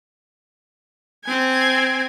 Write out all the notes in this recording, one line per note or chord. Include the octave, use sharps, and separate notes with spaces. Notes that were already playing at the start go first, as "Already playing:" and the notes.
C4 G#5